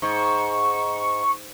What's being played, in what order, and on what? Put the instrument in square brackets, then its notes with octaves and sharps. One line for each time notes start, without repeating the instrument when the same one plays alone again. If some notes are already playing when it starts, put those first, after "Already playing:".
[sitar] G#2 [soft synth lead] C#6